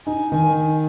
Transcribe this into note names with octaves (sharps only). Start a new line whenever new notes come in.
D#4 G#5
D#3 G#5